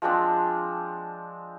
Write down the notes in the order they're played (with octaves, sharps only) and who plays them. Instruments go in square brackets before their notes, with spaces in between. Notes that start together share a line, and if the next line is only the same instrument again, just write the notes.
[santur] F3 G#3 C4 D4